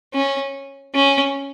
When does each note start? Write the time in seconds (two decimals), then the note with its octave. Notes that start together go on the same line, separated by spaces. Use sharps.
0.14 C#4
0.95 C#4